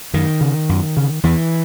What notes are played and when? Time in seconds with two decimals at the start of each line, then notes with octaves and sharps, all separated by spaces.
0.13 F#2 D#3
0.41 C#3
0.69 F#2
0.97 C#3
1.23 E2 E3